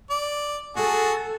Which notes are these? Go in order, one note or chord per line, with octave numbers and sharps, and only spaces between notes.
D5
F#4 G#4 A4